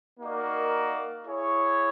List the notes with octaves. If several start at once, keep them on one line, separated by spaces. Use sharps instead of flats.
A#3 D#4 F#4 A#4 D5
E4 G#4 C#5